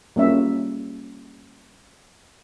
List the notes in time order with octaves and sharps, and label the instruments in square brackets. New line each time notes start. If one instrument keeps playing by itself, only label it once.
[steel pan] G3 A#3 C#4 E5